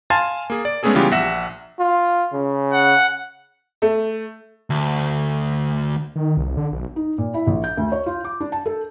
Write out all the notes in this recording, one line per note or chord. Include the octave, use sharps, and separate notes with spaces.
F5 G#5 A5 C6 A6
A#3 G#4
D5
G#3 A3 B3 C#4 G#4 A4
C#3 E3 G3 B3 F4 G4
A#1 E5 F#5 A#6 E7
F4
C#3
F#5
A3
D2
D#3
C2
D3
B1
D#4
A#2
E4
A#1
G6
D2
C#5
F4
D6
D4
A5
A4